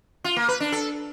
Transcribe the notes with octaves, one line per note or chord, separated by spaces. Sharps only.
F4
A#3
B4
D4
A4